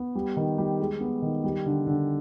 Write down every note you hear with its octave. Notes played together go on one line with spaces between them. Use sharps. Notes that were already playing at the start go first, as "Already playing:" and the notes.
Already playing: B3
G3
D#3
G3
G#3
B3
D#3
G3
D3
D3